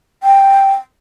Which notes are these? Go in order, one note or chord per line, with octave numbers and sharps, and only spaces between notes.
G5